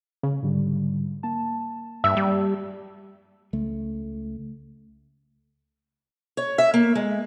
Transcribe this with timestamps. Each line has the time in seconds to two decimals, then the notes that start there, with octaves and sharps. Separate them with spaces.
0.23 C#3
0.42 G#2 D3 G3
1.23 A#3 A5
2.04 G2 E5
2.17 G3
3.53 C#2 A3
6.37 C#5
6.58 E5
6.74 A#3
6.95 G#3